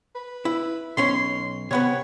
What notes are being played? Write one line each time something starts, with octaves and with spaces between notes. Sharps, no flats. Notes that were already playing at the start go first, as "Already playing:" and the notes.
B4
E4
B1 C#4 C#5 C6
C3 B3 B4 C#5